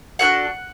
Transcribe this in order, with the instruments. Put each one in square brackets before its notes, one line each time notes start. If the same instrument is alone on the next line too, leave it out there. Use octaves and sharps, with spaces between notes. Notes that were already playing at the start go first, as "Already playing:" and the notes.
[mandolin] D4 F#4 A4 F#5 F#6